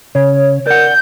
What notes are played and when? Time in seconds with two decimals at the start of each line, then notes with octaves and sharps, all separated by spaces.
0.15 C#3 C#5
0.67 A#4 D5 F#5 G6